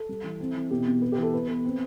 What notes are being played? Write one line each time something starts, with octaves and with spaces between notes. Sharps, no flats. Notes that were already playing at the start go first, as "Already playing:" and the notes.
Already playing: A4
G3
E3
C4
E3
B2 G4
B2
B3
G4
E3 A4
B3 B4
B3
C4